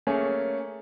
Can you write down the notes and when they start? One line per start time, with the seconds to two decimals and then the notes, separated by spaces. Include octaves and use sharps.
0.07 A3 A#3 C#4 G#4